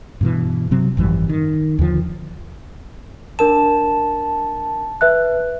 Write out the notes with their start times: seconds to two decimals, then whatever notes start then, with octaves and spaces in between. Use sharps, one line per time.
0.21 G2 B2 E3
0.71 C3 F#3 C4
0.97 G#1 F#2 E3 G3
1.29 D#3
1.79 D#2 D3 F3
3.39 D4 A#4 A5 E7
5.01 B4 E5 F#6